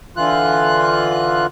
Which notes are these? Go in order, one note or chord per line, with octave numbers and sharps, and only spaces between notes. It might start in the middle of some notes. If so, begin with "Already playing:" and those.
D3 E3 F4 F#6